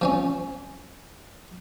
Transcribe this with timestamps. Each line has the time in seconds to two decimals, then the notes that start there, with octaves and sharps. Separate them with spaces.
0.01 F3 C4 C#4